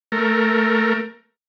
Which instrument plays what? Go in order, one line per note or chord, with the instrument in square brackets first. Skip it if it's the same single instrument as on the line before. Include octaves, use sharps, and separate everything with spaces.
[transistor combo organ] A3 A#4